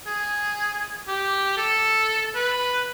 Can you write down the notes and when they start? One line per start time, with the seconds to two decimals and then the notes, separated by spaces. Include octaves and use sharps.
0.07 G#4
1.07 G4
1.57 A4
2.35 B4